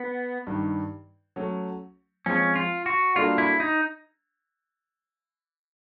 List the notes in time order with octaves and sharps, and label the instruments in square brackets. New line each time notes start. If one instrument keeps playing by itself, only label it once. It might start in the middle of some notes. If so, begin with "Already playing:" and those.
Already playing: [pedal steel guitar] B3
[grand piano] G2 D#3 G3
F#3 A3 C#4
[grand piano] F3 G#3 C4 [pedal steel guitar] C#4
[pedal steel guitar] F4
F#4
[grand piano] G3 A#3 D4 F#4 A4 [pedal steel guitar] F4
[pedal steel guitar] E4
D#4